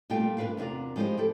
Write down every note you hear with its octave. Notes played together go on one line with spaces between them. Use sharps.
A#2 G3 A3 F4 G5
A#2 D4 A#4 B4 F5
E2 C3 D4 F4 A#4
F3 G#3 B3 E4 G4 C5
E4 G4 A4